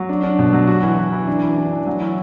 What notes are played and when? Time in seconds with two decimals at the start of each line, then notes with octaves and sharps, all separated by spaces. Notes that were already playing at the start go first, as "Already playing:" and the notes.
Already playing: F#3
0.09 D4
0.23 D4
0.39 B2
0.53 F#3
0.67 F#4
0.83 E3
0.98 E3
1.13 E3
1.27 D4
1.42 E3
1.57 D4
1.72 E3
1.87 F#3
2.01 E4